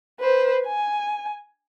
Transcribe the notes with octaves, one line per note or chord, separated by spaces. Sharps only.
B4 C5
G#5